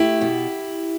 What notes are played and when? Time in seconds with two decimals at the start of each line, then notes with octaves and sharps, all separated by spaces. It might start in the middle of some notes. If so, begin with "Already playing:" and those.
Already playing: A3 E4 G4
0.21 B2